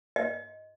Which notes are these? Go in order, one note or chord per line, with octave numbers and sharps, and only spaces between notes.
D#5